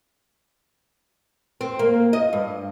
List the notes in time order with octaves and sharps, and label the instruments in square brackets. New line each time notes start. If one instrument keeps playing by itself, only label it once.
[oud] C4
A#3
D#5
G2